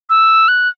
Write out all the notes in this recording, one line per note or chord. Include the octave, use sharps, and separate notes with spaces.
E6
F#6